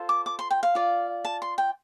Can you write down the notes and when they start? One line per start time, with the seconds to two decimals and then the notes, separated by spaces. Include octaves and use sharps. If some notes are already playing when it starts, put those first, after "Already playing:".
Already playing: F4 A4 C5
0.09 D6
0.26 D6
0.39 C6
0.50 G5
0.63 F5
0.75 F4 D5
1.25 A5
1.42 C6
1.58 G5